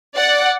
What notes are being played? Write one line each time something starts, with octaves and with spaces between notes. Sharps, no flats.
D5 F#5